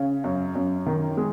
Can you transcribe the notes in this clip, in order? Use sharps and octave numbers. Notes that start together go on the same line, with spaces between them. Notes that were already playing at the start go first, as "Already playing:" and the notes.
Already playing: C#3
F#2
F#2
D#3
G#3